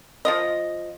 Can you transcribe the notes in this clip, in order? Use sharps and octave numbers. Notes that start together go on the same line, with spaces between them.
F3 F4 D#5